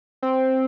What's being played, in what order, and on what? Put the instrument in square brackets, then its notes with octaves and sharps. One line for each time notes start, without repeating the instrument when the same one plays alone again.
[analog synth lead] C4